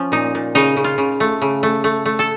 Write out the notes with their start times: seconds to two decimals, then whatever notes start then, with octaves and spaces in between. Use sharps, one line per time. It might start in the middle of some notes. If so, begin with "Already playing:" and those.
Already playing: F3 C#4
0.12 A#2 D#4
0.35 A#2
0.55 C#3 D#4
0.76 C#3
0.84 F4
0.98 C#3
1.20 A3
1.42 C#3
1.63 A3
1.84 A3
2.06 A3
2.19 A4